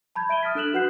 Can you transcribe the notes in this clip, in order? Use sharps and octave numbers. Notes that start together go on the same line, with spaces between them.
A5 B5 G6 G#6
E5 D7 D#7 G7
D#6 F6 A6 B6
D4 A4 F#6 E7 F#7
F#4 B4 F#5 F#6 G6 C7